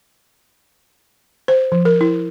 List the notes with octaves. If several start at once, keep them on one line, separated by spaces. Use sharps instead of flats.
C5
F3
A#4
E4